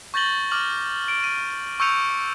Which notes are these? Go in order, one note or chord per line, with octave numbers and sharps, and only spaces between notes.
C#6 G6 A6 A#6 F#7 G7
D6 F6 F#7
D7
D#7
C#6 E6 G6 C#7 D#7 F7